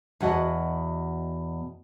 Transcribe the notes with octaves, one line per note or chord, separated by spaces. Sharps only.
E2 B2 F#4 D#5